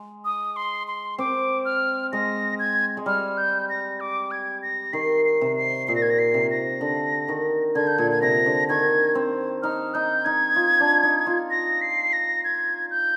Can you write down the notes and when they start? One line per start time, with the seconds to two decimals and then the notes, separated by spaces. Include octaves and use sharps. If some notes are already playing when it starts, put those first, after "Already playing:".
Already playing: G#3
0.25 D#6
0.56 C6
0.87 C6
1.18 C4 D6
1.65 F6
2.12 G#3 A#6
2.59 G#6
2.97 G#3
3.06 G3 F6
3.38 G6
3.69 A#6
4.00 D6
4.31 G#6
4.62 A#6
4.93 D#3 C7
5.25 C7
5.41 C3
5.56 C7
5.88 A#2 C7
5.96 A#6
6.02 G#6
6.10 A#6
6.19 C7
6.34 C3
6.50 A#6
6.81 D3
7.28 D#3
7.75 D3 G#6
7.87 G6
7.98 A#2 G#6
8.11 G#6
8.22 C3 A#6
8.46 D3
8.69 D#3 G#6
9.15 C4
9.63 D#4 F6
9.94 D#4 G6
10.25 D#4 G#6
10.56 F4
10.80 D4
11.03 D#4
11.27 F4
11.51 A#6
11.81 C7
12.13 A#6
12.44 G#6
12.91 G6